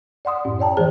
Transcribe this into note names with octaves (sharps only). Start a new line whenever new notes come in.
D5 F#5 C6 D#6
F#2 A2 C#4
C#5 D5 G5 A5 A#5
E3 F3 G#3 G#4 C5